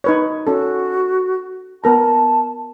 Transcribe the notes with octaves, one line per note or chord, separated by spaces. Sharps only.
D#4 B4 C#5
C#4 F#4 A4
B3 A#4 A5 A#5